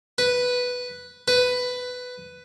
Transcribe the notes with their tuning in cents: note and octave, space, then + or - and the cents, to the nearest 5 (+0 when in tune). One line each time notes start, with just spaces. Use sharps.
B4 +0
B4 +10